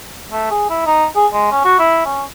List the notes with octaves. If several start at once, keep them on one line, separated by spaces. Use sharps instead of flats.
A3
G#4
E4
D#4
G#4
G#3
C#4
F#4
E4
C#4